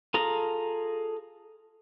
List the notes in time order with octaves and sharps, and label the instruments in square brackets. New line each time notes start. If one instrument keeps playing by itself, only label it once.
[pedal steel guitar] F4 G#4 A4 A#5